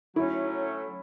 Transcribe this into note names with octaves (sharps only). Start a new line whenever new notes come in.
F#3 A3 C#4 E4